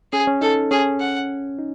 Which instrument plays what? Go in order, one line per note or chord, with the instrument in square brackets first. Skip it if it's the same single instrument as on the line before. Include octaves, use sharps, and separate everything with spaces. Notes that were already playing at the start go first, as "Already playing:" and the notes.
[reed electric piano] C#4 [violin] G#4
[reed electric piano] C#4
[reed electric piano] D#4 [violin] A4
[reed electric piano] C#4 [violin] G#4
[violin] F#5
[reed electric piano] D#4